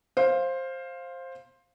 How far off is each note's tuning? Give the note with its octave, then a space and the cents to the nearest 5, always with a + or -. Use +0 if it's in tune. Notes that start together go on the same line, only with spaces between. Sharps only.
C5 +15 F5 +0